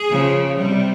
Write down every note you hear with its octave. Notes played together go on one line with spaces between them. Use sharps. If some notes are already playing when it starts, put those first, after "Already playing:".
Already playing: G#4
C#3 F3
C3 G3